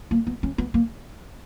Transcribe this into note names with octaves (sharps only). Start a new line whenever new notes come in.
A#3
B3
C#4
B3
A#3